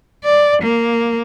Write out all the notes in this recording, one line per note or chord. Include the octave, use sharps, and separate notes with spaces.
D5
A#3